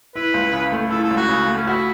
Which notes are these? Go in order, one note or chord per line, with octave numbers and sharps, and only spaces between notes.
E4 B4
C#2
C#3
A3
E4 A4
A4
C#2
F#4
C#3
A3
C#4
E4 F#4